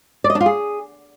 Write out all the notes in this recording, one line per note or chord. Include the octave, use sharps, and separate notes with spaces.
D5
D#5
D4
F4
G#4